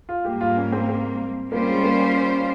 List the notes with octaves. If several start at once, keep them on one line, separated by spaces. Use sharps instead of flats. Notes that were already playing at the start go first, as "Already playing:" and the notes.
F4
G#2 G3 A#3 G4
F4
C#4
C4
C4
G3 A#3 C#4 F4 C5
G#3
A#3